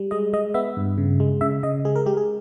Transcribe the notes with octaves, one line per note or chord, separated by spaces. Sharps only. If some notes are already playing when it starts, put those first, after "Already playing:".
Already playing: G3
G#3 D#5
G#3 D#5
B3 E5
G2
C#3
G#3
C#3 E5
C#3 D#5
G#3 G#4
A#4
G#3 G4
G#4